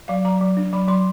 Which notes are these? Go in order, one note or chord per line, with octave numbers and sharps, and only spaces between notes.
F#3 F5
F#3 A#5
F#3
D4
F#3 B5
F#3 C6